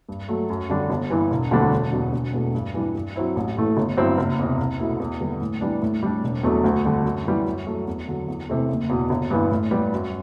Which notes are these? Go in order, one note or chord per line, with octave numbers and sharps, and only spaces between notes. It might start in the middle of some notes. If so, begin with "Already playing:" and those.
G2
F#3 A3
F#2
D3 G3 D4
G1
G2 E3
E1
D2 D3 G3 D4
E1
E2 B2 G3
E1
E2 B2 A3
G2
E3 G3 D4
G2
F#3 C4 E4
A1
A2 E3 A3
G1
G2 F#3 C4 E4
F#1
E2 C3
C2
B2 A3 E4
E2
D3 G3 B3
A2
E3 G3 B3 D4
A2
G3 D4
E1
E2 B2 F#3 A3
D2
D3 G3
F#2
E3 G3 B3 E4
F#2
F#3 A3
E2
D3 F#3
E2
C3 E3 A3
F#1
E2 B2
G1
G2 E3 B3
A2
G3 B3
F#2